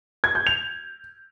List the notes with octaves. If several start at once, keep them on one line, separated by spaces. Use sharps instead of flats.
G#6
G6
F7